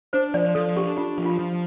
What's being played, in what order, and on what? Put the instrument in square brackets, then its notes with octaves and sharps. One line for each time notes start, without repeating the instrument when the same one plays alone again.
[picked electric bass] D4 [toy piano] C5
[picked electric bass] F3 [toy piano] D5
[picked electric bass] F3 [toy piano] A4
[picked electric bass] D4 [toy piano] G4
[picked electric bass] D4 [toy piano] F4
[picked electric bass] F3
[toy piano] F4
[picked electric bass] F3